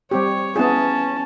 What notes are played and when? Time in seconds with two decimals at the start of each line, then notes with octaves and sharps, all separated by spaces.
0.11 G3 C4 G4 C#5
0.56 B3 C#4 E4 G#4 A5